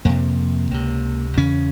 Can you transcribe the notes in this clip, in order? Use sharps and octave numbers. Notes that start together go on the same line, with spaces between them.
F2 C3 A#3
C#2 C3
E2 C#3 C#4